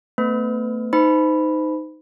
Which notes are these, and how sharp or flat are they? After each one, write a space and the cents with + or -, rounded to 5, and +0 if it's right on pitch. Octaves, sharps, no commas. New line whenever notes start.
A3 +35 C4 -45 B4 +35
D#4 +0 C5 -35 B5 +0